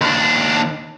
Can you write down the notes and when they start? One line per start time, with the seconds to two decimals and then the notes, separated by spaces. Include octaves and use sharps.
0.01 D#2 D4